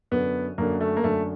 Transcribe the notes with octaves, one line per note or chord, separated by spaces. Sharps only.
F#2 D3 B3
F#2 D3 A#3
A3
A#3
F#2 D3 A3